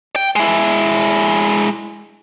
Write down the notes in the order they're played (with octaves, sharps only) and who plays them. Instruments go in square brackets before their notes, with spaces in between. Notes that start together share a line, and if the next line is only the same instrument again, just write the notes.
[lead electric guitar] G5
G#3 E4